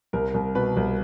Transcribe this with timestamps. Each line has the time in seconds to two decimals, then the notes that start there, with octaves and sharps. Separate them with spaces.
0.13 C2 A#4
0.34 C2
0.55 B2 B4
0.77 C2